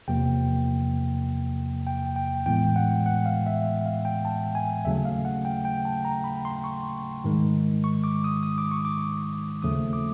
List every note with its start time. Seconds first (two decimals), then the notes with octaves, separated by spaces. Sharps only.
0.08 E2 C3 F3 A#3 G5
1.87 G5
2.16 G5
2.46 A2 E3 G#3 B3 G5
2.76 F#5
3.06 F#5
3.26 F5
3.46 E5
3.86 F5
4.05 G5
4.25 A5
4.55 G#5
4.85 D#2 C#3 F#3 A3 E5
5.05 F5
5.25 F#5
5.45 G5
5.65 G5
5.85 A5
6.05 A#5
6.24 B5
6.45 C6
6.64 C#6
7.24 G#2 D#3 G#3
7.84 C#6
8.04 D6
8.24 D#6
8.43 D#6
8.58 D6
8.71 C#6
8.85 D6
9.62 D#2 C#3 F3 A3 D#6
9.93 D6